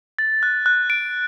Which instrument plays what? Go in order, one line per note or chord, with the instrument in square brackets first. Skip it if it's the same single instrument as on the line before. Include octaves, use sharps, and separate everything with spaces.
[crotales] A6
F#6
F#6
D7